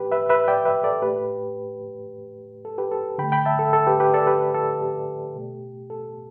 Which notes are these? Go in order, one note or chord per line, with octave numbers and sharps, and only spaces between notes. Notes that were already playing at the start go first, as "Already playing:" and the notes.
Already playing: A2 E3 A3 G4 B4
B4 E5
B4 E5
D5 G5
B4 E5
A4 D5
A2 A3 G4 B4
A4
G4 B4
A4
D3 A3 G5 B5
G5 B5
E5 A5
A4
A4
G4 B4
G4 B4
A4 D5
G4 B4
A4
G4
B2 A3
A4